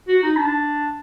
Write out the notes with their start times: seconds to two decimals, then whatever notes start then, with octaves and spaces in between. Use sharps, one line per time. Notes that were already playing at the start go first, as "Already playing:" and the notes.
0.08 F#4
0.23 D#4
0.37 D4